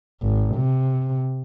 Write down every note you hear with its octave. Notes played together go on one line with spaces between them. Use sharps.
G#1
C3